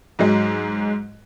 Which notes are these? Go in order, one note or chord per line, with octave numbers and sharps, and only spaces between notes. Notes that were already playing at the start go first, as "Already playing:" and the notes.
G#2 F#3 G#3